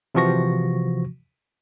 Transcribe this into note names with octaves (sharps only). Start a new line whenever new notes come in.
C3 E3 F3 F#4 C#6 A#6